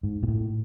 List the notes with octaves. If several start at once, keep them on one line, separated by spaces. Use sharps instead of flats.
G#2
A#2
A2